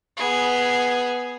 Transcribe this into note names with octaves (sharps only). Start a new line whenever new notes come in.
B3 G#4